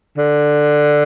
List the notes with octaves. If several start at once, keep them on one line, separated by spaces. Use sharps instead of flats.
D3